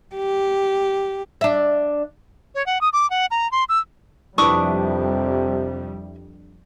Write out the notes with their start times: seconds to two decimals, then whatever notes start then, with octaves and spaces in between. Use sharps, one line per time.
0.15 G4
1.41 D4 E5
2.55 C#5
2.66 F#5
2.81 D#6
2.93 D6
3.10 F#5
3.31 A#5
3.52 C6
3.69 E6
4.38 F2 C3 G3 D4 E4 B4 C#6 D#6